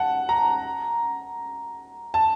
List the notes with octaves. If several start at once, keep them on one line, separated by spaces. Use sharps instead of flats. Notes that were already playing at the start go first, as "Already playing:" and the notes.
Already playing: F#5 A5
A#5
A5